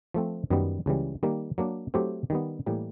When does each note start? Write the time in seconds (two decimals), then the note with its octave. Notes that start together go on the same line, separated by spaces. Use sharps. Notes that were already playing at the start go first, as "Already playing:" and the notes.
0.14 F3 A3 C4
0.50 F#2 D#3 G3 B3
0.86 C#2 C#3 E3 G3
1.23 D#3 G3 A#3
1.58 F#3 A#3 D4
1.94 F#3 A3 C4 E4 G4
2.30 D#3 G3 B3
2.66 A2 E3 G3 A#3